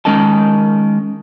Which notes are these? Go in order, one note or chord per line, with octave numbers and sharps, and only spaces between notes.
D#3 G#3 C#4 A#4 D#5 A5